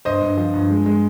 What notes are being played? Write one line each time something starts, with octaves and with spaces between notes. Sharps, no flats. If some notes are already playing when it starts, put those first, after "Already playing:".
G2 C5 D#5
G2
F3
G2
G#3
G#3